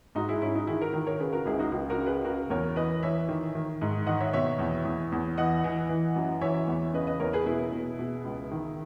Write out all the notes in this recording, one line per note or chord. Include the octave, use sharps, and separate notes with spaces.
G#2 D#4 F#4
E4 G#4
G#2 C#4 E4
D#4 F#4
D#3 E4 G#4
F#4 A#4
D#3
A#4 C#5
C#3 G#4 B4
F#4 A#4
C#2 E4 G#4
D#4 F#4
C#2
F#4 A#4
C#3
G#4 B4
C#3 F#4 A#4
E2 A#4 C#5
E3 B4 D#5
E3 C#5 E5
D#3
D#3
G#2
D#3 D#5 F#5
C#5 E5
B2 C#5 E5
E2
E2
E2
E3 D#5 F#5
E3
E3
F#2
E3 C#5 E5
E2
C#3 B4 D#5
B4 D#5
E2 A#4 C#5
G#4 B4
B2 E4 G#4
B2
B2
C#2
D#3